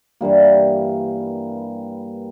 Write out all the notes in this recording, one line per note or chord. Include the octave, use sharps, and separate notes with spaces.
G2 E3 G3 A#3